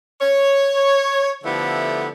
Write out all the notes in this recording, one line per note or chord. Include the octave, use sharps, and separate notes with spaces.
C#5
D3 F3 A3 B3 E4 G4